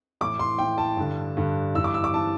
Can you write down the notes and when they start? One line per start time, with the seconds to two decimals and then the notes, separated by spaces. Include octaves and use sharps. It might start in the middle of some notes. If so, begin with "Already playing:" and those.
0.21 A2 E3 D6
0.39 C6
0.58 A2 E3 G5
0.78 A5
0.97 G2 D3
1.37 G2 D3
1.75 G2 E3 E6
1.84 D6
1.94 E6
2.04 D6
2.14 E3 A5